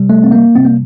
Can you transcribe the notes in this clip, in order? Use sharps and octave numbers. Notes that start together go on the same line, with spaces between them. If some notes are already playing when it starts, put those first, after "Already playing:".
Already playing: C3 G3
A3
C4
A#3
C3 G3 C4
A#3